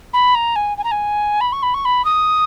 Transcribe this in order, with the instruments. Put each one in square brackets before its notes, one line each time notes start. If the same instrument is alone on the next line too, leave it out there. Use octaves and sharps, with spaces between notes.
[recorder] B5
A#5
G#5
G#5
A#5
G#5
B5
C#6
B5
C#6
B5
D#6